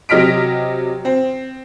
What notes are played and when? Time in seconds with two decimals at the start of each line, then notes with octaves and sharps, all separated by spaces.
0.09 C3 F#3 D#5 F6 B6 D7
1.05 C4